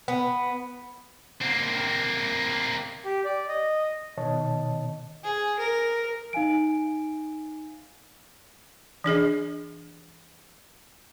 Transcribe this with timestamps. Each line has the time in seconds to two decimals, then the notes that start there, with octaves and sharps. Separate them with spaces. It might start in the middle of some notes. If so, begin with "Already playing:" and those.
0.08 B3
1.41 A#3 C4
3.05 G4
3.25 D5
3.48 D#5
4.18 B2 D#3 C#5 D#5 A5
5.24 G#4
5.59 A#4
6.33 D#4 F5 G#5 D7
9.04 E3 D4 G#4 D#5